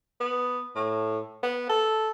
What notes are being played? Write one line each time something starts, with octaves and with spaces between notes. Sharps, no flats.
B3
A2
B3
A4